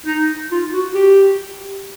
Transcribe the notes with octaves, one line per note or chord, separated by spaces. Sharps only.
D#4
F4
F#4
G4